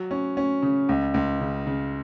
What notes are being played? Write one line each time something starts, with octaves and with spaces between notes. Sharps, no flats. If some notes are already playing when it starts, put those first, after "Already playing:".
Already playing: F#3
C#4
C#4
C#3
C#2
C#2
C#3
C#3